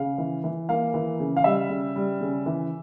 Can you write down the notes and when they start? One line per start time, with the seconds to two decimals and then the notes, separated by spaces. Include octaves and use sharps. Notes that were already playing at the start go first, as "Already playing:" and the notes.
Already playing: C#3 F5
0.18 E3
0.44 E3
0.69 A#3 F5
0.94 E3
1.20 C#3
1.36 F5
1.44 G3 E5
1.69 C#3
1.96 G3
2.21 C#3
2.46 E3